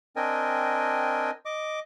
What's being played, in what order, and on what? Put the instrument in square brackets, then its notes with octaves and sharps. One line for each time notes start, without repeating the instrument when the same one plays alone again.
[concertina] C4 D4 A#4 D#5 G5 G#5
D#5 D6